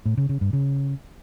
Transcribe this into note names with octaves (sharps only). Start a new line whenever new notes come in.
A2
C#3
C#3
G2
C#3